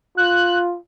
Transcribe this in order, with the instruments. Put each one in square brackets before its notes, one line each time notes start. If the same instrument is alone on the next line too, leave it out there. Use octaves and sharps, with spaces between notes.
[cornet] F4 [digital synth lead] F#6